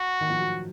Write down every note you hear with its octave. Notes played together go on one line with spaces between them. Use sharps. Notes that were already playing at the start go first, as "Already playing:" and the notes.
Already playing: F#4
D#3
F3
F#3